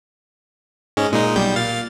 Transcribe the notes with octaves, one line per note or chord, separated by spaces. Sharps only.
G#2 G#3 C#4
A#2 G#3 D#4
B1 G3 G6
A#2 F5 A6